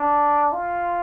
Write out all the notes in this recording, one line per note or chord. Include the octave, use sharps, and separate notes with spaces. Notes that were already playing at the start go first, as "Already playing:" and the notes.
Already playing: D4
F4